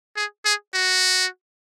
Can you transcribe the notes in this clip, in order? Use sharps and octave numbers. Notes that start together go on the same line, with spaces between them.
G#4
G#4
F#4